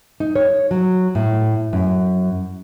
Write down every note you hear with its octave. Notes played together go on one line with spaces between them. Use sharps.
D#4
C#5
F#3
A2
F#2